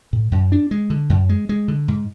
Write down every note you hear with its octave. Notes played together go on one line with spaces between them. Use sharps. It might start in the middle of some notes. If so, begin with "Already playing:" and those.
A2
F#2
D4
G#3
D3
F#2
G#3
G#3
D3
G#2